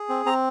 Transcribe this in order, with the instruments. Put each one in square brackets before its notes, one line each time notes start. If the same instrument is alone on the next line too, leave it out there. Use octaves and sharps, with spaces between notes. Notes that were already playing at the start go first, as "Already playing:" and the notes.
Already playing: [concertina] G#4
C4
C4 A#5